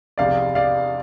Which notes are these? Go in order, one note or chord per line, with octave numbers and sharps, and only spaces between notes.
F1 E2 C3 D5 F5
D5 F5